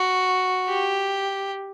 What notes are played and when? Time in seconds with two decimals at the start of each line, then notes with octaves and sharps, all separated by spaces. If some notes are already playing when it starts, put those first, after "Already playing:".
Already playing: F#4
0.69 G4